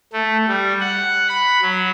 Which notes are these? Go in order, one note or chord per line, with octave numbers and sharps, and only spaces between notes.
A3
G3
F#5
B5
F#3